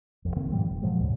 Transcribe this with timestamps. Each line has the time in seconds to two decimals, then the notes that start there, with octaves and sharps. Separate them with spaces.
0.25 B1 F2
0.36 C3 D#3 A#3 C4
0.52 G#2 B2 F3 G3
0.69 F1
0.82 A#2 F3 F#3 G#3
1.00 D2 G#2 C#3